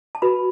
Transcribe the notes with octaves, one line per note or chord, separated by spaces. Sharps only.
A5
F#4 B4 B5